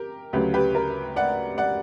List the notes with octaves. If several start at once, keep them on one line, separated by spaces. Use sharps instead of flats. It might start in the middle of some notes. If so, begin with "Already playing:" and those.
Already playing: G4 A#4
D2 C#3 F#3 G4 B4
G4 B4
A#4
D5 F#5
D5 F#5